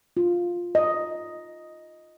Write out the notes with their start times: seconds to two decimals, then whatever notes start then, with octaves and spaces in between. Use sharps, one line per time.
0.17 F4
0.75 D#5